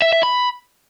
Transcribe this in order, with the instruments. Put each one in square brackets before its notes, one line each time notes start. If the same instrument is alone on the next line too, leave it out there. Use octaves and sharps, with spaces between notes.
[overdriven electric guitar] E5
E5
B5